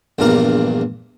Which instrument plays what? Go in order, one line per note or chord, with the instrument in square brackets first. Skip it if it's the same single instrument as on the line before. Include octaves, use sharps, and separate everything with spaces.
[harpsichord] A#1 E2 G2 A#2 A#4